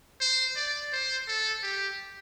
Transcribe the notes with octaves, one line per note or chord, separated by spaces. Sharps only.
C5
D5
C5
A4
G4